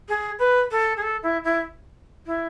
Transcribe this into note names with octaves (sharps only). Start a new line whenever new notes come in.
G#4
B4
A4
G#4
A4
E4
E4
E4